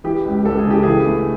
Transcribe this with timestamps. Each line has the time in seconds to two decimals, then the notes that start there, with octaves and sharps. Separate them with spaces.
0.04 E3 G4
0.25 C#2
0.45 C#2 A4
0.58 G#4
0.66 C#3 G4
0.83 E3 G#4
1.07 A3